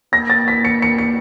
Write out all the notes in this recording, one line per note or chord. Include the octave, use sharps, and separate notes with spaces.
A#3 A#6
A6
B6
C#7
C#7
C#7